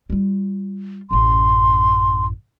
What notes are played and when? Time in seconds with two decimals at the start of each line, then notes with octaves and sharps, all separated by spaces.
0.10 G3 F4
1.11 A1 F#2 C6